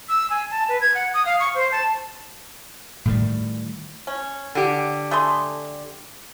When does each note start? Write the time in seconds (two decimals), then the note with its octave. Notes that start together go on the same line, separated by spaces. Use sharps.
0.09 E6
0.30 G#5
0.51 A5
0.69 B4
0.81 G#6
0.95 F#5
1.14 D#6
1.26 F5
1.40 C#6
1.55 C5
1.72 A5
3.05 A2 D#3 G3
4.07 C#4
4.55 D3 G4
5.11 A3 G#4 C6